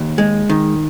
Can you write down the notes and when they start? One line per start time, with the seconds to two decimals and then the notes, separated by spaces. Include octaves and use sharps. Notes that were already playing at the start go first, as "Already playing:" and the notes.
Already playing: D#2
0.18 G#3
0.49 D#3